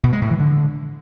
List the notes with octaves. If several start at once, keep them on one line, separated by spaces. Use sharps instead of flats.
B2
G#3
A2
E3
D3